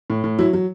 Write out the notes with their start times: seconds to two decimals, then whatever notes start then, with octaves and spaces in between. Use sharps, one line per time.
0.10 A2
0.24 A2
0.38 F#3 E4
0.53 F#3